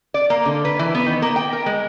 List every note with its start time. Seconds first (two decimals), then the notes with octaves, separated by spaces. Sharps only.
0.14 D5
0.30 A#3
0.46 D3
0.65 B4
0.79 E3
0.95 B3
1.06 D#3
1.22 A#3
1.36 G5
1.53 A#4
1.66 G#3